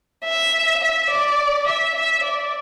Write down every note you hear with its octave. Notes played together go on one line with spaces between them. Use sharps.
E5
E5
D5
E5
E5
D5